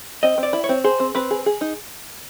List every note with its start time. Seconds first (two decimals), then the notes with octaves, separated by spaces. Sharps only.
0.23 C4 D#5
0.38 C4
0.43 D5
0.53 E4
0.64 C#5
0.69 C4
0.84 G#4 C5
1.00 C4
1.15 C4 B4
1.31 G#4
1.46 G#4
1.61 D#4